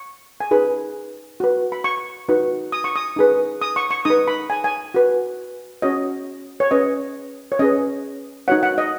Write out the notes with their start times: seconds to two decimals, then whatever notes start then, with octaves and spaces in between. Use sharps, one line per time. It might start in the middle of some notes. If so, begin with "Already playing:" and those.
Already playing: C#6
0.41 G#5
0.51 D#4 G#4 B4 B5
1.40 F#4 B4
1.72 B5
1.84 C#6
2.29 D#4 F#4 B4
2.72 D#6
2.84 C#6
2.96 D#6
3.16 D#4 G#4 B4
3.61 D#6
3.76 C#6
3.91 C#6
4.05 D#4 B4 D#6
4.28 B5
4.50 G#5
4.64 G#5
4.94 F#4 B4
5.82 C#4 F#4 C#5 D#5
6.60 C#5
6.71 C#4 G#4 B4 D#5
7.52 C#5
7.59 C#4 G#4 B4 D#5
8.48 D#4 F#4 C#5 F#5
8.63 F#5
8.78 D#5